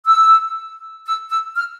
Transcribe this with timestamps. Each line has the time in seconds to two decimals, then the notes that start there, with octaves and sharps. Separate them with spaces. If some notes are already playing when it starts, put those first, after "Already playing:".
0.06 E6
1.06 E6
1.30 E6
1.55 F6